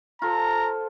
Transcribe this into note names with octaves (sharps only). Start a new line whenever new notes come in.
F4 A4 C5 A#5